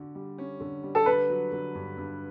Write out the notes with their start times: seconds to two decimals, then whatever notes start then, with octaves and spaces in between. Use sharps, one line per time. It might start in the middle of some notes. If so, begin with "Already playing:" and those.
Already playing: D3 F#4
0.15 G3
0.38 C#4
0.60 D3
0.83 G3
0.95 A4
1.06 D3 B4
1.29 F#3
1.52 D3
1.75 G2
1.98 G2